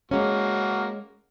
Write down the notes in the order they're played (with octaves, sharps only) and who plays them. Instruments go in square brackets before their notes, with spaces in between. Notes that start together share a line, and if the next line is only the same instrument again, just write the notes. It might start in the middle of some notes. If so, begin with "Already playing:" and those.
[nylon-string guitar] G#3 C#4 [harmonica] A#3 F#4